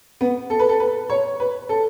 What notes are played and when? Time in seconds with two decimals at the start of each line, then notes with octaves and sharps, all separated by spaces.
0.21 B3
0.50 A4
0.59 B4
0.69 A4
0.80 B4
1.10 C#5
1.40 B4
1.69 A4